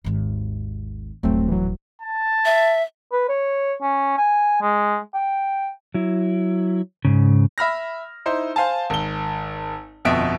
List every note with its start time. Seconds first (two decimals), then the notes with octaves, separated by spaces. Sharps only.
0.04 G#1 D#2
1.23 D#1 A1 F#3 A3 C4
1.48 E3 F#3
2.02 A5
2.45 E5
3.12 B4
3.29 C#5
3.82 C#4
4.18 G#5
4.62 G#3
5.14 G5
5.94 F#3 E4
7.05 G#2 C#3
7.58 E5 B5 F6 A#6
8.26 D#4 E4 C5
8.56 C5 F5 G#5 A5
8.90 G#1 G7
10.05 G1 F2 B2 E5 D7